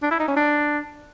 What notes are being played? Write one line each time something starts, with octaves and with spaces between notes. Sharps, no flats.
D4
E4
D#4
C#4
D4